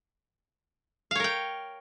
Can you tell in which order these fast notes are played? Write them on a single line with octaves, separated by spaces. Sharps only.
F5 C#5 A#4 G5